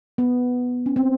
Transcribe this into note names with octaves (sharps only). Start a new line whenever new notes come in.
B3
C#4
C4